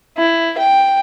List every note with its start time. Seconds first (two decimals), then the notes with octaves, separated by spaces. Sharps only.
0.18 E4
0.58 G5